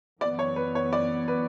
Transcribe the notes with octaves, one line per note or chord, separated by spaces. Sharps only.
F#2 E3 B3 D5
C#5
B4
C#5
D5
B4